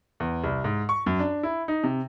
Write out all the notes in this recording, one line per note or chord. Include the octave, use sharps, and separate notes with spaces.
E2
C2
G#2
C#6
F#2
D4
E4
D#4
C3